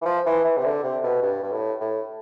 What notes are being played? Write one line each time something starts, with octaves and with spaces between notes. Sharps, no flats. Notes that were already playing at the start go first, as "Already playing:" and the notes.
E3
F3
E3
E3
C3
D3
C3
B2
G2
G2
A2
A2